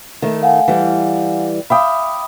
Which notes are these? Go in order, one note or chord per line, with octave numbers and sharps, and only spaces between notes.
D#3 A3
F5 F#5 G#5
E3 G3
E5 F5 G5 B5 D6 D#6